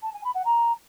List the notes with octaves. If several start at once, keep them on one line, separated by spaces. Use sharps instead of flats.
A5
G#5
B5
F#5
A#5